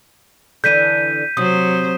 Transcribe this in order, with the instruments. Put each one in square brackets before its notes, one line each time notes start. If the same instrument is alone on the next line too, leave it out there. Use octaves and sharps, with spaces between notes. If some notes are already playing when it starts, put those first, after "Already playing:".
[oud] D3 E3 D4 [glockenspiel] G6 B6 D#7
[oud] C3 [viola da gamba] F#3 C5 [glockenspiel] D#6